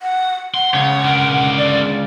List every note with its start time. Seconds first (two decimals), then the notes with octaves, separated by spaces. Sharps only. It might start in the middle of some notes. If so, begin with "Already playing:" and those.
0.01 F#5
0.54 F#5 C6
0.74 C#2 C#3 C#5
1.05 D3 A#4
1.58 D5